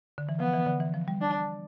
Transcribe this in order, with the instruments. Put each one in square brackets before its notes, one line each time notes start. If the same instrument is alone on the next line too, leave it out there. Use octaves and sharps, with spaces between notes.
[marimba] D3
E3
[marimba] F3 [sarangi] B3
[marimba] E3
D3
E3
F3
G3
[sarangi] D4